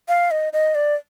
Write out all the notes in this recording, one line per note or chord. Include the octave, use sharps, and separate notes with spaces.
F5
D#5
D#5
D5